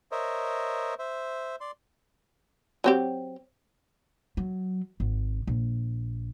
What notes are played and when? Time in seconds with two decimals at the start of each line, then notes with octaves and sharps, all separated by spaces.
0.12 A#4 C5 C#5 D#5 E5
0.99 C5 E5
1.61 D5 C6
2.84 F#3 C4 G4
4.37 F#3
5.00 G#1
5.47 A#1